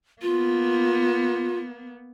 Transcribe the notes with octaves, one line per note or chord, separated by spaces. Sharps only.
A#3 B3 F4